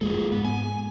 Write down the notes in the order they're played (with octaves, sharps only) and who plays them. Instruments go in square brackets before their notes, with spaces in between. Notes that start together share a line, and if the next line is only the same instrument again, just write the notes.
[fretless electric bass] F1 G#3 A#3 [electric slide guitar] F4 G#4 A4
[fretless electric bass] G#2 [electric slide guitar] B3
[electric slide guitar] G#5